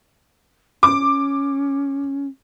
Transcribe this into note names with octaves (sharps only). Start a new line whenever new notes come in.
C#4 D6